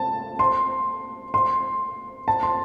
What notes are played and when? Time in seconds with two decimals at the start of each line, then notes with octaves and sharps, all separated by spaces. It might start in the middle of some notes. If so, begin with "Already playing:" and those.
Already playing: A5
0.39 C6
1.34 C6
2.28 A5
2.43 C6